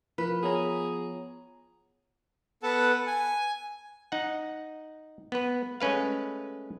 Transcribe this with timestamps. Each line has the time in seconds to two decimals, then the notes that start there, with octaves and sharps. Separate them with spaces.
0.18 F3 A#4 B4
0.43 B3 G#4 C#5 A#5
2.63 B3 A4 B4 F#5 A5
3.07 G#5
4.12 D#4 F#5
5.32 B3 B4
5.80 G#3 A3 C#4 B4 F5